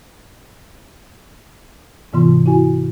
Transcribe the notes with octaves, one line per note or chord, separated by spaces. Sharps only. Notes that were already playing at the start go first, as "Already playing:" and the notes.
G#2 C3 E3 B3 F4 C6
E4 F#4 G#5